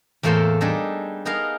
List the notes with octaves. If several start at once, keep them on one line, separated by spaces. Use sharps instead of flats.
E2 A2 A#3 A4 C5 C6
G3 D4 D#4 G#4 A4
B3 D#4 G#4 A#4 F5